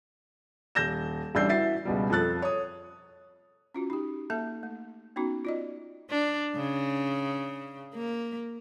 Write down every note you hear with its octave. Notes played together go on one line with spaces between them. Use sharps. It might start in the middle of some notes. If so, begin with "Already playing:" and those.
D#1 G6 A#6 E7
A1 G3 D4 E6 G6 C7
E3 F#4 E5 A6 C7
C#2 B2 G3
F2 F3 A4 F#6 A6
C#5 D#6
C#4 F4 F#4
D#4 G4
A#3 A4 E5 A5
A3
B3 C#4 D#4 F#4
F4 D5 D#5
D4
C#3
A#3